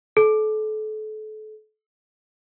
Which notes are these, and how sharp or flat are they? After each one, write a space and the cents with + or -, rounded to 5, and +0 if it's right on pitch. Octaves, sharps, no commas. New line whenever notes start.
A4 -35